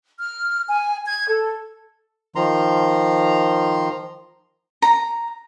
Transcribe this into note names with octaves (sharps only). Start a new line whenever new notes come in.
F6
G#5
G#6
A4
D#3 F3 A#5 C6
A#5